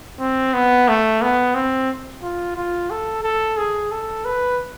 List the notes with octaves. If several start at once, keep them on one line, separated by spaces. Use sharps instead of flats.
C4
B3
A3
B3
C4
F4
F4
A4
A4
G#4
A4
B4